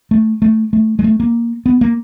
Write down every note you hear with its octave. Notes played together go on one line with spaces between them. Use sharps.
A3
A3
A3
G#3
A3
A#3
B3
A#3